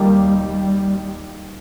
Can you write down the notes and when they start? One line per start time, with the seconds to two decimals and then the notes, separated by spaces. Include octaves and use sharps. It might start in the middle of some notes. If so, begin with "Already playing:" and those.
Already playing: D#2 D#3 G3 A#3 G4
0.40 G3